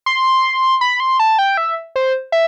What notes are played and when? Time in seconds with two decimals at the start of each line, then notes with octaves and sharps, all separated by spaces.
0.06 C6
0.81 B5
1.00 C6
1.20 A5
1.39 G5
1.57 E5
1.96 C5
2.32 E5